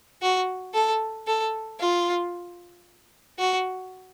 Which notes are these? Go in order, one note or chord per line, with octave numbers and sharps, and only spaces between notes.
F#4
A4
A4
F4
F#4